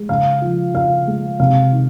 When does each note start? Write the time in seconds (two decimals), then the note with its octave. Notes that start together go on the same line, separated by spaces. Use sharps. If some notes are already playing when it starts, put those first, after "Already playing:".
Already playing: G#3
0.09 C#3 F5
0.41 F3
0.74 C#3 F5
1.07 G#3
1.39 C3 F5
1.72 D#3